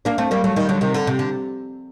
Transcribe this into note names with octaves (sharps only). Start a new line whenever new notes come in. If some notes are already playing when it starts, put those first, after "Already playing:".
A#3 D4
A3 C4
G3 A#3
F#3 A3
D#3 G3
D3 F#3
C3 D#3
D3
C3
D3